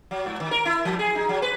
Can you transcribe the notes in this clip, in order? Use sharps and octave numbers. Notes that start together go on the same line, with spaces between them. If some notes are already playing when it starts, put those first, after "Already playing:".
F#3
G#2
D#3
A#4
E4
F3
G#4
D#4
F#3
B4